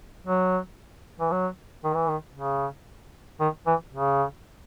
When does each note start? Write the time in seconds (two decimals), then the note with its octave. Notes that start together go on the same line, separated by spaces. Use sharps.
0.26 F#3
1.20 E3
1.31 F#3
1.83 D#3
1.95 E3
2.08 D#3
2.35 C#3
3.40 D#3
3.66 E3
3.92 C#3